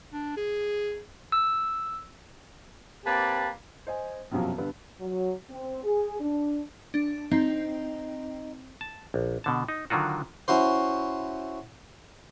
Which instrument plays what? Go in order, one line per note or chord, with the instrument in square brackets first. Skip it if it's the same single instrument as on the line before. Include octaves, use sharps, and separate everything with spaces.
[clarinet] D4
G#4
[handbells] E6
[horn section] A#3 C4 G4 B4 D5 A5
[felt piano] C5 D#5 G#5
B1 F#2 C3 F3 F#3
G2 D3 B3
[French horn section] F#3
C4
G#4
D4
[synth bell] D4
[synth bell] C4 [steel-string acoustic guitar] D#4
[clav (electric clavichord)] A5
A#1
B2 D3 A5
D#4
D3 D#3 F#3 F4 F#4
[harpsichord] C#4 E4 F#4 C5